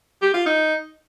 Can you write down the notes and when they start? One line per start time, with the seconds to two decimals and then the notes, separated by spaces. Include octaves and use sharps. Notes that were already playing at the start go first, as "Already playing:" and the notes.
0.22 G4
0.34 F4
0.46 D#4